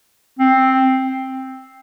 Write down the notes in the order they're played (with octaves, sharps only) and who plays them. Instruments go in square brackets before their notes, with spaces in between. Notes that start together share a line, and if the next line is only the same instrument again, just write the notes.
[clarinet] C4